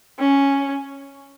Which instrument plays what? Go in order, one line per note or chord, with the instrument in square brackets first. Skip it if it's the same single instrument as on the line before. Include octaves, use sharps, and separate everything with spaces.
[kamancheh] C#4